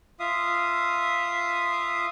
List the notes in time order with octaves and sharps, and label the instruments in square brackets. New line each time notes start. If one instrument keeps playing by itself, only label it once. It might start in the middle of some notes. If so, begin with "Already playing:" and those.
[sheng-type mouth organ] F4 E5 F5 D#6